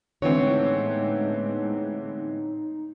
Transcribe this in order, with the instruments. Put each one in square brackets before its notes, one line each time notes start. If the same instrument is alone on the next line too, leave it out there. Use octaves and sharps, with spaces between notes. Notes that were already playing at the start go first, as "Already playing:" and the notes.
[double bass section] A2 G#3 B3 [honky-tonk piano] D3 E3 C4 [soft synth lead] D#4 [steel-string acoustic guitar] C#5